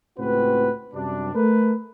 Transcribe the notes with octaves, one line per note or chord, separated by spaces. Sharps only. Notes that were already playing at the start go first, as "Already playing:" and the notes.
C#2 A2 C4 F#4 B4
F#2 C3 G3 D4
A3 A#4 B4